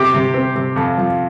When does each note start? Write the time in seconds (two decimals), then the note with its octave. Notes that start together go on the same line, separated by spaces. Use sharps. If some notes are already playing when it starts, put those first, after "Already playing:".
Already playing: C3 G4
0.14 C3
0.34 C4
0.56 C3
0.76 F2
0.98 F3